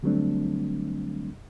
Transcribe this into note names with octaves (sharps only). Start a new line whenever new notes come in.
D3 F#3 G3 A3 C4 D4